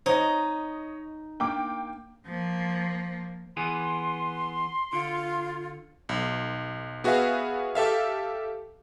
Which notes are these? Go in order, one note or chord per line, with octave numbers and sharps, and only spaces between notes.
D#4 C5 C#5 D#5
A#3 D4 G5 D6
F3 A#3
E3 B3 G#4 C6
D3 F4
B1
B3 F#4 G#4 B4 E5 F5
G4 A4 E5 F5